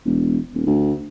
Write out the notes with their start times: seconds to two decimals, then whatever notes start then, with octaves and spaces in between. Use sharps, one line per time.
0.05 E1
0.54 D#1
0.67 D2